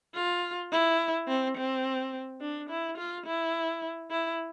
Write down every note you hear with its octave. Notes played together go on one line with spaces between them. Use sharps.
F4
E4
C4
C4
D4
E4
F4
E4
E4